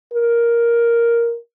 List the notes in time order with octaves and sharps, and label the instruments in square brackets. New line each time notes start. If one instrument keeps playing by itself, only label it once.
[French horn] A#4